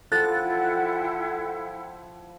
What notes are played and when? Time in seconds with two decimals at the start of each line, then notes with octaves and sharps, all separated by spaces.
0.12 F3 E4 A4 F#5 G5 F#6 A6